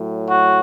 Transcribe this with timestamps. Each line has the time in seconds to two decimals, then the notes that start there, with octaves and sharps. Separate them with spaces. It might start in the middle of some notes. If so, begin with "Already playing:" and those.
Already playing: A2 F#3
0.28 F#4